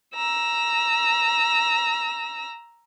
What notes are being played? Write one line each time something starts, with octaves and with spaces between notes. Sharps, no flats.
A#5 E6